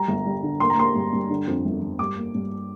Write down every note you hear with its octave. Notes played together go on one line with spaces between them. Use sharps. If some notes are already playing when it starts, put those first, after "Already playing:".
Already playing: G3 A#5
G1
G3
D3
A#3 C6
A#5
A#3 C6
G2
G2
D3
F2
G1
G1
G2 D6
A#3
G2